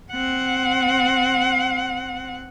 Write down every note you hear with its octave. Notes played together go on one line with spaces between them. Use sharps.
C4 F#5